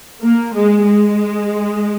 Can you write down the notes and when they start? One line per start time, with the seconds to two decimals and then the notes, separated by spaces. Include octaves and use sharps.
0.22 A#3
0.54 G#3
0.86 G#3